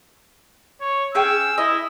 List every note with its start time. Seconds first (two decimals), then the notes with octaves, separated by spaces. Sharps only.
0.81 C#5
1.15 C#4 G#4 G5 E6
1.58 E4 D#5